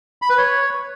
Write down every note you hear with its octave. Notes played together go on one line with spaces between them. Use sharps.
B5
B4
C#5